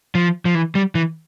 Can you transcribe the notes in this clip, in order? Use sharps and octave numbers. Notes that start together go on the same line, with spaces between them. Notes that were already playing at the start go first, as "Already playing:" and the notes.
F3
F3
E3
G3
E3